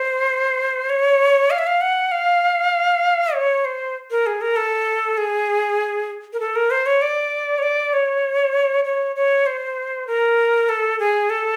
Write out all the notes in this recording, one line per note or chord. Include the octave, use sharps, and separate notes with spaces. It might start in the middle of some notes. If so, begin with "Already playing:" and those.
Already playing: C5
C#5
F5
E5
F5
F#5
F5
C#5
C5
A#4
G#4
A#4
A4
G#4
A#4
A4
A#4
C5
C#5
D5
C#5
D5
C#5
C#5
C#5
C5
A#4
A4
G#4
A4